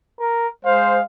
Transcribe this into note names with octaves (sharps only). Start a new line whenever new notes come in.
A#4
G#3 C5 F5